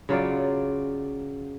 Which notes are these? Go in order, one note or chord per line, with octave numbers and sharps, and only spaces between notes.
C#3 F#3 F4 D5